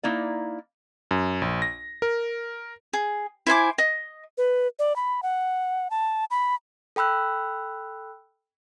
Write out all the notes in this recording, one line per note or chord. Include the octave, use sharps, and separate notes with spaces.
A#3 D#4 E4 D5
F#2
A#1
A#6
A#4
G#4
E4 C5 G#5 D6
D#5
B4
D5
B5
F#5
A5
B5
A4 G5 B5 E6 F#6